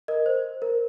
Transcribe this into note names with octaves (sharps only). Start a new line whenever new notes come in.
A#4 D#5
C5
A#4